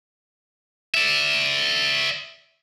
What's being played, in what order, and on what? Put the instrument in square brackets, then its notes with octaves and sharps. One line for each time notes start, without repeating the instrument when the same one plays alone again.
[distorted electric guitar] D5 E5